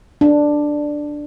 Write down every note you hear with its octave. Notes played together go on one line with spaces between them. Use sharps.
D4